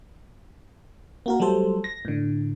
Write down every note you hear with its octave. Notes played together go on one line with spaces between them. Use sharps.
A#3 F#4 A#4
F#3 G3 A3 A4 C5
A#6
A2 D3